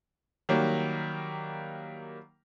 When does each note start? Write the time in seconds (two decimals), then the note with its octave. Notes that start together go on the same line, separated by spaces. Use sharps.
0.49 D#3 F#3 G3 A#3